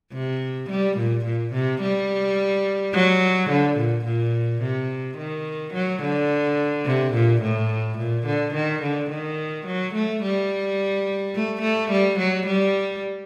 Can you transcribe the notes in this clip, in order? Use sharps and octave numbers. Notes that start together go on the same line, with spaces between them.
C3
G3
A#2
A#2
C3
G3
F#3
D3
A#2
A#2
C3
D#3
F#3
D3
C3
A#2
A2
A#2
D3
D#3
D3
D#3
F#3
A3
G3
A3
A3
G3
F#3
G3